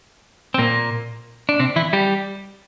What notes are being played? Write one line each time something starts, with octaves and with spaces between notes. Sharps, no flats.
C4
A#2 A#3
D4
C3 C4
E3 E4
G3 G4